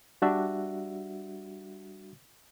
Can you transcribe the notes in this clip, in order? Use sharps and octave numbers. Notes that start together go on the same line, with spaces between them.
G3 D4 F#4 E5